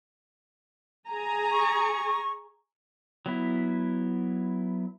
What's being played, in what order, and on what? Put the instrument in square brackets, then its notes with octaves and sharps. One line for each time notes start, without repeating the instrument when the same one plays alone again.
[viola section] G#4 G#5 A#5
[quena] C#6
[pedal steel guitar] F#3 B3 E4